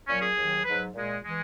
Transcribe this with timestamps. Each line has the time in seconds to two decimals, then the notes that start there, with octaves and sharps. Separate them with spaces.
0.07 A#2 F#3 C#4
0.22 G#4
0.36 D#2 D#3 F#3
0.65 G#2 F#3 B4
0.94 A#2 G#3
1.23 E3 G#3